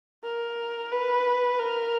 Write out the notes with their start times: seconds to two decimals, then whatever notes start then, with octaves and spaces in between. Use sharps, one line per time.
0.24 A#4
0.92 B4
1.59 A#4